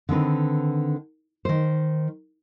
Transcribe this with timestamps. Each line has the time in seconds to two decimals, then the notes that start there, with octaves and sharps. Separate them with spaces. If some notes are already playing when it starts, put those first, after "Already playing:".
0.09 D3 D#3 C4 B4
1.45 D#3 C5